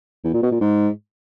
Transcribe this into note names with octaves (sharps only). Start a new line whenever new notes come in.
E2
A#2
B2
A#2
G#2